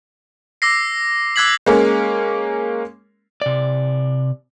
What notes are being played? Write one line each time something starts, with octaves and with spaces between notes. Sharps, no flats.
D6 E6 A#6 C7
D6 E6 F#6 G#6 B6 F#7
G#3 A#3 C#4
C3 D5